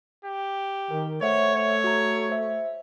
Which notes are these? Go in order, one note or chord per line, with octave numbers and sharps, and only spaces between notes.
G4
D#3 A#4
A3 C5 C#5 E5 F#5
C#5
F#4 A#5
C5 E5